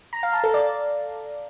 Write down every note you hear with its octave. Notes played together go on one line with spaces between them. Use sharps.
A#5
F5
A5
A4
D5